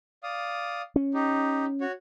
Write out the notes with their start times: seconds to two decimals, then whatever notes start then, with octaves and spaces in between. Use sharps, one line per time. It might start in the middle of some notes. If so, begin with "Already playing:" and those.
0.23 D5 F5 D#6
0.96 C#4
1.14 D#4 G4
1.81 F#4 C#5